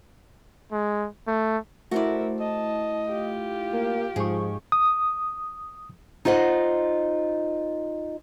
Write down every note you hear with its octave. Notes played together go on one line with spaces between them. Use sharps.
G#3
A3
A3 E4 F#4 A#4 C5 D5 E5
D#5 A5
F4 G4
A#3
G#2 F3 G#3 G#4 C#6
D#6
D#4 F4 C5 D#5 F#5